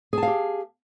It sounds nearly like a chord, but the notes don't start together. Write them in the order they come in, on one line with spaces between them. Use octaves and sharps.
G#4 A5 F5 G4